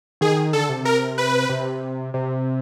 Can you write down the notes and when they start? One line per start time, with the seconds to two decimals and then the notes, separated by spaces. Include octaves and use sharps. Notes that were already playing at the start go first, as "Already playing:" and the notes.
0.21 D#3 G#4
0.53 D3 A4
0.69 C3
0.85 A#4
1.18 B4
1.49 C3
2.14 C3